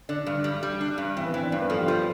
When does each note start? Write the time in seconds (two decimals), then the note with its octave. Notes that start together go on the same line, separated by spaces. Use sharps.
0.09 D3 D4
0.26 G2
0.44 G3
0.63 G3
0.81 D4
0.98 G2
1.16 E3 C4
1.25 B3
1.34 E3 C4
1.43 D4
1.52 G2
1.61 B4
1.70 F3 A4
1.79 G4
1.88 G3 F4